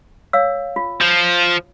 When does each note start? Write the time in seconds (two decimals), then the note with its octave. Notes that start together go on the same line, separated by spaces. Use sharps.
0.33 C#5 F5 E6
0.76 F4
1.01 F3